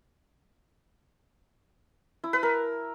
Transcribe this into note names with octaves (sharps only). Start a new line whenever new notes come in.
E4
B4
A#4